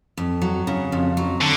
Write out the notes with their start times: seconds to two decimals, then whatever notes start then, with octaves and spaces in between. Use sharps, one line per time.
0.17 F2
0.42 F#3
0.67 C#3
0.92 F2
1.17 F#3
1.41 D3